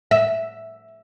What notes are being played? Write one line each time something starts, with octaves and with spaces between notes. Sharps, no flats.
E5